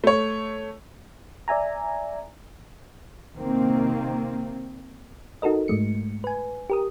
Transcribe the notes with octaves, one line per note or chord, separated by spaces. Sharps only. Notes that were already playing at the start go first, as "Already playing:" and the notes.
A3 C#5
D5 E5 G#5 A#5
C3 D#3 A#3 C4
D#4 F#4 A4 A#4 D#5
G#2 G#3 A3 C#7
B4 G#5
G4 A#4 D#6